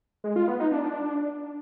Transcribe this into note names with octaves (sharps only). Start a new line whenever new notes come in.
G#3
F4
B3
D#4
D4